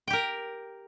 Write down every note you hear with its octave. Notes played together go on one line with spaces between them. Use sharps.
G4 A#4 G5